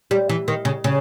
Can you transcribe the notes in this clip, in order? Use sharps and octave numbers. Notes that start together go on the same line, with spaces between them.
G3
E3
D#3
C#3
C#3